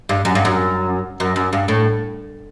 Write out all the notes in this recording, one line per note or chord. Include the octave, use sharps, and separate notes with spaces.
G2
F#2
G2
F#2
F#2
F#2
G2
A2